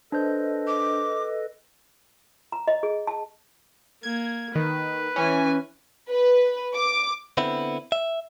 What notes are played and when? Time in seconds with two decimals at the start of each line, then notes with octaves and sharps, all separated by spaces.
0.12 D4 A4 B4 C5 D#5 G6
0.67 D6
2.52 A#5
2.68 D#5
2.83 G#4
3.07 A5
4.03 A#3 G#6
4.55 D#3 B4
5.16 E3 C#4 G#5
6.10 B4
6.75 D6
7.37 D3 B3 C4 E4
7.92 E5